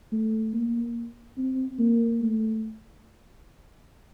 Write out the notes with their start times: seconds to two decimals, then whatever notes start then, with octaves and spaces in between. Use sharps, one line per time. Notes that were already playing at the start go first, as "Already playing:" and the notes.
0.12 A3
0.53 A#3
1.37 C4
1.79 A#3
2.21 A3